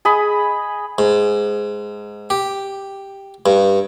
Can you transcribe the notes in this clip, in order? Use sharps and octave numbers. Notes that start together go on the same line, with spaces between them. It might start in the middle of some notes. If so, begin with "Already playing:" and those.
G#4 D#5 B5
G#2
G4
G2